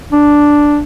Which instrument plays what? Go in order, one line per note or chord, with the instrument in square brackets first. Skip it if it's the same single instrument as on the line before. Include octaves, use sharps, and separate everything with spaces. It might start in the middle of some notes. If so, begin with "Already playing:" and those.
[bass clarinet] D4